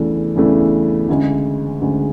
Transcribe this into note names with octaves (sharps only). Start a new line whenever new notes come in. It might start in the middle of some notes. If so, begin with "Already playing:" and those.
Already playing: E2 C#3 E3 A3 D4
E2 C#3 E3 A3 D4
D2 C#3 G#3
D2 C#3 G#3